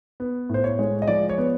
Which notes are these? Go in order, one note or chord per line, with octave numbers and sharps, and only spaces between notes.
B3
A2 C5
C#5
G#3
D#5
F3 D5
C#5
B3